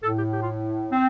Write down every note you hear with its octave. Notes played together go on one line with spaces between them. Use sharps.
A2 A4
G4
G4
F4
C4